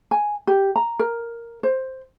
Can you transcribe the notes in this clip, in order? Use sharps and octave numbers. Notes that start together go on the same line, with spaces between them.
G#5
G4
A#5
A#4
C5